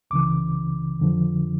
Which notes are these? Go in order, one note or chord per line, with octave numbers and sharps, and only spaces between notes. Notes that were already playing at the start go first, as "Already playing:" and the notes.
C#2 C#3 E3 D6
F2 D3 F3